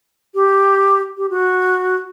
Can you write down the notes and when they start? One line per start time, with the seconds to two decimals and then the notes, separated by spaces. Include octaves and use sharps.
0.35 G4
1.18 G4
1.30 F#4